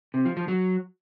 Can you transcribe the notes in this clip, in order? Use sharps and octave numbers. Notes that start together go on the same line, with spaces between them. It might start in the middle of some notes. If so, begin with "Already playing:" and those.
C3
F3
F3
F#3